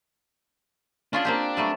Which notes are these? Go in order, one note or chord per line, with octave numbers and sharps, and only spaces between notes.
C#4 D4 F4 G#4
A#3 C4 G4
F#3 G3 A3